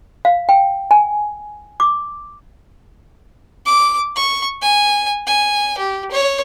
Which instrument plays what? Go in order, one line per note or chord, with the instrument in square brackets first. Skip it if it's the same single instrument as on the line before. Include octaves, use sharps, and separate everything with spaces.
[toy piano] F5
G5
G#5
D6
[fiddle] D6
C#6
G#5
G#5
G4
C#5